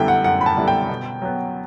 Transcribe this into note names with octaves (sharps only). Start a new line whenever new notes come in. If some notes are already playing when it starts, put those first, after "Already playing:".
Already playing: F#2 D3 G3 B3 E4 G5
F#5
F#2 F#5
B5
A5
D3 G3 B3 E4
G5
B2
F#3 B3